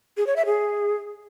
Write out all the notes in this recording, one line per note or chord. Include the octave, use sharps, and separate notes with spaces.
G#4
C#5
E5
G#4